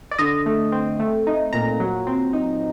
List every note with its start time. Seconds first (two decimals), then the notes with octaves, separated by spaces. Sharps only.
0.11 D5
0.18 D3 D#5
0.46 A3
0.72 C4
1.00 A3
1.27 D#4
1.53 A#2 A#5
1.80 F#3
2.07 C4
2.33 D#4